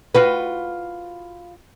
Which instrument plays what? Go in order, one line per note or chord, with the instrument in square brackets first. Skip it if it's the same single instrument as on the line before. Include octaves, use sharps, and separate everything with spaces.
[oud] F4 F#4 B4